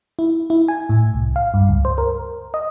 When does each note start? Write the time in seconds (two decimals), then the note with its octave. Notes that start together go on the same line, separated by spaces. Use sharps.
0.19 E4
0.50 E4
0.68 G#5
0.89 A2
1.14 C2
1.36 F5
1.54 G2
1.69 C#2
1.85 C5
1.98 A#4
2.54 D#5